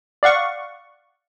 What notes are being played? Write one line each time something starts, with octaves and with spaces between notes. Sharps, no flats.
D5 F5 F#5 C#6